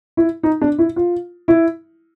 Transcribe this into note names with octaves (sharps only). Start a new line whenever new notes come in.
E4
D#4
D4
E4
F4
E4